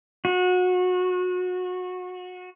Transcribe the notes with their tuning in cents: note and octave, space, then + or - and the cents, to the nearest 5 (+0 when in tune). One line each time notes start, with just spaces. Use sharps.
F#4 -25